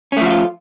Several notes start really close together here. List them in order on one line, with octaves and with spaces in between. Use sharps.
C#4 A3 F3 F#4 F4